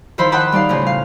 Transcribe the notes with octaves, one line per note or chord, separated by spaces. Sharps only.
D#3 F3 E4 C5 B5
F#5 G5 A5 B5 C#6 D#6
G3 D#4 D5 F5
A2 C#3 F3
F5